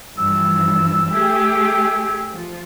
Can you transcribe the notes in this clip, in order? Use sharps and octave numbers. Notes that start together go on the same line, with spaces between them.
G2 E3 F3 E6
A3 G4 G#4
F3